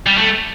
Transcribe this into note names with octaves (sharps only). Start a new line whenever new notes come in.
G3
A3